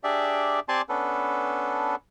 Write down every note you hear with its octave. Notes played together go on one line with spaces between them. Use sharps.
D4 G4 G#4 D5 E5
C4 G4 D5 G#5 A5 C6
B3 C#4 D4 A4 B4